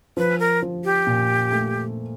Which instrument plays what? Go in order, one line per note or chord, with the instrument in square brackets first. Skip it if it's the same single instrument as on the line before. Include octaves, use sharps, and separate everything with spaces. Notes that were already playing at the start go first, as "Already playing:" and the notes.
[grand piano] F3 [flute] B4
[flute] A#4
[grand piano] F3
[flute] G4
[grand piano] A#2
A3